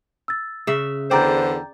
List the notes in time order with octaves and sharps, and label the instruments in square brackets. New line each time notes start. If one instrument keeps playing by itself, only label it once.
[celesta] E6 A6
[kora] C#3 E5
[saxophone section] E2 D3 C5 [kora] D5 [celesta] G5 A#5 G6